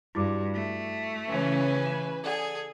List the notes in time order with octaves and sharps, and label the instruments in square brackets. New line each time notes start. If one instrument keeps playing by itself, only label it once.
[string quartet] G2 [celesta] E4 F#4 D6
[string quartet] A3
[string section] C#3 E3 C#4 [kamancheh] B4 G#5
[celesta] E7
[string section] G#4 [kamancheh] A4 [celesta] D5 F#5